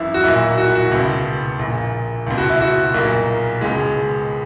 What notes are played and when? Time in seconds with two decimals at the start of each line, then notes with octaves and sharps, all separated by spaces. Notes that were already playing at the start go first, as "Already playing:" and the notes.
Already playing: G#1 F#2 E3 E4
0.14 F#4
0.24 B1 A#2 E4
0.58 F#4
0.66 E4
0.75 F#4
0.91 C#2 B2 E4
1.59 A#1 A#2
2.26 C#2 B2
2.38 F#4
2.49 E4
2.62 F#4
2.94 B1 A#2 A#3
3.61 C#2 B2 G#3